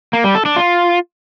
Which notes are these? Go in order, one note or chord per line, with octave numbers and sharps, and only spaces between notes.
A#3
G3
A4
D4
F4